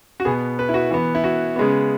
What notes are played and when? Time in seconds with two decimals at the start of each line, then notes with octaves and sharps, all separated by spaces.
0.20 F#4
0.25 B2 B3 G#4
0.59 B4
0.69 E4
0.74 F#4
0.91 E3 B3
1.15 E4
1.24 F#4
1.56 C#3 G#3 B3